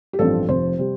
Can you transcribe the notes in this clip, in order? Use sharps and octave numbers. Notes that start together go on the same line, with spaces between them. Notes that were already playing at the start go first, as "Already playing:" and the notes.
G4
A1 G2 F3 C4 A4
F1 F2 F3 C5
C3 G3